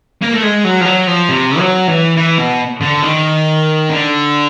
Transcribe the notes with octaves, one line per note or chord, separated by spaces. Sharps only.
A#3
A3
G#3
F#3
F3
F#3
F3
C3
F#3
E3
E3
B2
D3
D#3
D3